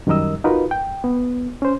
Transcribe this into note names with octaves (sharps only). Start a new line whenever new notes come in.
F#2 D#3 G3 A#4 D#5 E6
D#4 F4 F#4 A#4 B4
G5
B3
C#4 C5